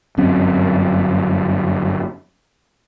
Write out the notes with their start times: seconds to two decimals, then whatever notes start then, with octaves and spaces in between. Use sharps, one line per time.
0.17 G1 F#2 C4 C#4